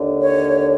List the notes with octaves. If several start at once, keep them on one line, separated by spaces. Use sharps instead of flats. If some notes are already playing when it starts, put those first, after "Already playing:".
Already playing: D#2 D3
C#5